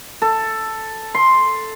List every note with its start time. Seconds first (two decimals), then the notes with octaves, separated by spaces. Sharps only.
0.22 A4
1.15 C6